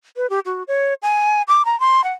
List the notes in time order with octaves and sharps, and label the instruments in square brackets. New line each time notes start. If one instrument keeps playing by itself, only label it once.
[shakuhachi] B4
G4
F#4
C#5
G#5
D6
A#5
C6
F#5